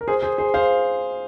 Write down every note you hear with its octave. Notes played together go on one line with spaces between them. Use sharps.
A#4
G#4 C5
G#4 C5
G#4 C5
C5 F5